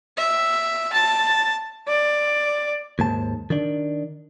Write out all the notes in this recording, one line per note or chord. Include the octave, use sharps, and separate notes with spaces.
E5
A5
D5
D#2 G#2 A5
D#3 D4